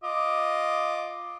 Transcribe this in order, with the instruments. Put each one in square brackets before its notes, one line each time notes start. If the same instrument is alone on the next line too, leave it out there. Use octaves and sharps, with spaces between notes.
[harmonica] F4 D#5 D6